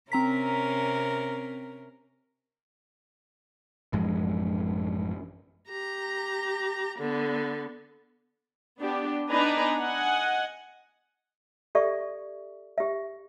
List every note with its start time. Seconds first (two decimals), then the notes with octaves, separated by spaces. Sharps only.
0.12 C3 C4 C#4 A#4 A#5 B6
3.93 A1 F#2 F3 G#3
5.68 G4 A#5
6.99 D3 B3
8.77 B3 D4 G4
9.30 B3 D4 D#4 B4 G#5 A#5
9.79 D#5 F#5 G#5
11.75 G4 A4 D5 E5 C#6
12.78 G4 E5